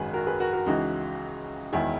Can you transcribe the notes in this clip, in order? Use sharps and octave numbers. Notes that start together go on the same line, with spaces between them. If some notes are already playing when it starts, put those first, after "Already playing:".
Already playing: G#1 F#2 D#3 G#4 B4
F#4 A#4
G#4 B4
F#4 A#4
F#4 A#4
C#2 C#3 E3 D#4 F#4
E1 E2 D#3 E4 G#4